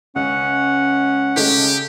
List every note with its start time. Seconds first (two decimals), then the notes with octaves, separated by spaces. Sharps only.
0.16 C#2 C#4 F#5
1.37 C#3 G#3 A3 G4